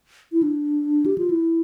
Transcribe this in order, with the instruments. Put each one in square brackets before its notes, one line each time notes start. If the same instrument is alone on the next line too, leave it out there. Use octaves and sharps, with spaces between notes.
[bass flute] E4
D4
G4
F4
E4